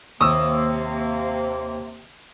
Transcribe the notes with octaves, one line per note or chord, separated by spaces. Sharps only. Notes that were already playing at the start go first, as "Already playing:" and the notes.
D#2 C3 A#3 C#6 D#6 E6